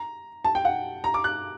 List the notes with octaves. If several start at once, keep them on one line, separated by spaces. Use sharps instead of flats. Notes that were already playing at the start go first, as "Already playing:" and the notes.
Already playing: A#5
A5
G5
F#5
A#5
D6
F#6